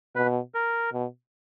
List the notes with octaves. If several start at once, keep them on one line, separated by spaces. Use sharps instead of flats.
B2 B4
A#4
B2